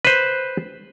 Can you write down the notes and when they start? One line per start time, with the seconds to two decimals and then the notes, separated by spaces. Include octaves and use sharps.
0.05 B4 C5